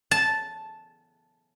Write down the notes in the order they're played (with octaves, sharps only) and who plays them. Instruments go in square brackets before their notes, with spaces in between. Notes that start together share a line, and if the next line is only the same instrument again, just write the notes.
[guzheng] A5